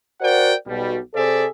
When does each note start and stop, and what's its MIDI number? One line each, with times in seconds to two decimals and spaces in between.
0.21 0.53 66
0.21 0.53 70
0.21 0.53 72
0.21 0.53 74
0.21 0.53 78
0.21 0.53 79
0.66 0.98 35
0.66 0.98 47
0.66 0.98 55
1.14 1.46 48
1.14 1.46 68
1.14 1.46 69
1.14 1.46 72
1.14 1.46 74
1.14 1.46 76